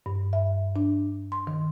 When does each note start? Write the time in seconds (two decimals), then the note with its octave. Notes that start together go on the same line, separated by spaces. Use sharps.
0.06 G2
0.33 E5
0.76 D4
1.32 C6
1.47 D#3